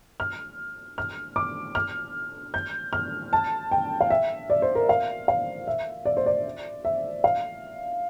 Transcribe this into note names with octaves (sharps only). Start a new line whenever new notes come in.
F6
F6
D6
F6
G6
F6
A5
G5
F5
E5
D5
C5
A#4
F5
F5
E5
D5
C5
D5
E5
F5